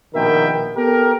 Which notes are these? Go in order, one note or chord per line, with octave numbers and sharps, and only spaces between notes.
A#1 B2 D#3 A#4 E5 G5
B3 G4 A4 A#4